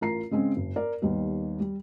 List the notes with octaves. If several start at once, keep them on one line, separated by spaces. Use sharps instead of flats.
A1 F4 A#4 A#5 C7
C#3 G#3 C4 C#4
F#1
A#4 D5
D#2 D#3 G3 B3
G3